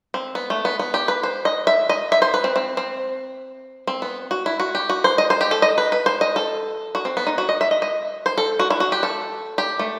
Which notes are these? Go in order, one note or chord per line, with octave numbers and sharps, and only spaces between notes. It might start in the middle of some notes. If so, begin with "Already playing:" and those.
C4
B3
A3
B3
B3
G4
B4
C5
D#5
E5
D#5
E5
C5
B4
C4
C4
C4
C4
B3
F#4
E4
F#4
G4
F#4
C5
D#5
C5
G4
A4
D#5
B4
B4
C5
D#5
A4
F#4
C4
B3
D#4
F#4
D#5
E5
D#5
D#5
C5
A4
F#4
E4
F#4
G4
A4
G4
A3